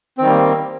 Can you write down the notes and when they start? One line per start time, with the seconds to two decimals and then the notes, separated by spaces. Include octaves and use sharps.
0.18 C4
0.21 D#3
0.25 G3
0.28 A#3